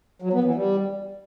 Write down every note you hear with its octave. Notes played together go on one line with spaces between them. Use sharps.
F#3
B3
E3
G3